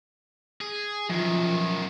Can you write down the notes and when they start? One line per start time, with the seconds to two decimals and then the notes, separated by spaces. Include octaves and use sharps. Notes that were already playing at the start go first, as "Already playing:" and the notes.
0.61 G#4
1.09 F#2 D#3 F3